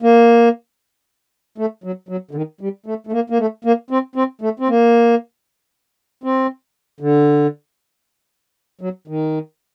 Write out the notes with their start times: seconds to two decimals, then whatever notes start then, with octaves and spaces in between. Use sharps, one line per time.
0.02 A#3
1.58 A3
1.84 F#3
2.09 F#3
2.31 D3
2.35 D#3
2.61 G3
2.86 A3
3.07 A3
3.12 A#3
3.30 A#3
3.39 A3
3.65 A#3
3.90 C4
4.16 C4
4.41 A3
4.60 C4
4.69 A#3
6.24 C4
7.00 D3
8.81 F#3
9.08 D#3